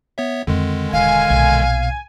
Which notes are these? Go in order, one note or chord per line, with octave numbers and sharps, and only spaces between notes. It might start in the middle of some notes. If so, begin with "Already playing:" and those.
B3 C#5 E5
F2 D3 D#3 G#3
E1 E4 F5 G#5
B1 A#2